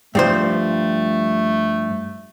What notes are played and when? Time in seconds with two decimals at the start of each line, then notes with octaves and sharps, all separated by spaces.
0.15 G2 F3 A3 C5